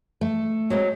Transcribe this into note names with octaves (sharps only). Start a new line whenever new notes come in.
A3 A4
F#3 G#3 C4